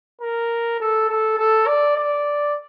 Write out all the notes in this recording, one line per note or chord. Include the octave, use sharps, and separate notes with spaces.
A#4
A4
A4
A4
D5
D5